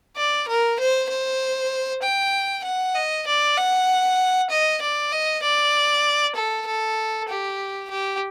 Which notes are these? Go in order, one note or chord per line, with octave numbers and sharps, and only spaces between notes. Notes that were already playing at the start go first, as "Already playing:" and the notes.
D5
A#4
C5
C5
G5
F#5
D#5
D5
F#5
D#5
D5
D#5
D5
A4
A4
G4
G4